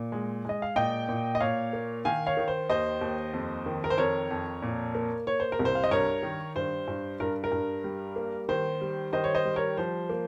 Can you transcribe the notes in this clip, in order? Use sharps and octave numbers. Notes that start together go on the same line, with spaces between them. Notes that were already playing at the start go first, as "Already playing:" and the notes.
Already playing: A#2
G#3
G#3 D#5
F5
A#2 D#5 G5
A#2
D#5
A#2 C#5 F5
A#3
D#3 F5 G#5
C#5 F5
D#3
C5
D#2 C5 D#5
D#2
F2
D#3
A#4
C5
F2 A#4 C#5
F2
A#2
A#3
A#3 C#5
C5
A#4
C2
C5
F5
D#5
G2 A#4 C#5
D#3
G2 C5
G2
G2 A#4
A#4
G2
G3
A#3
D#3 C5
G3
D#3 C5 D#5
C#5
C5 D#5
G3
A#4 C#5
F3 C5
A#3